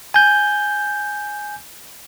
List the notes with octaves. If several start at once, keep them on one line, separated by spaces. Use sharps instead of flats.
G#5 G6